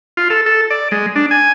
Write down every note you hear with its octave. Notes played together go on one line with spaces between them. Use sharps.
F4
A4
A4
D5
G#3
D4
G#5